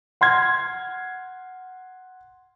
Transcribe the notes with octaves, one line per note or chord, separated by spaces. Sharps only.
F#5 C6 F6 G#6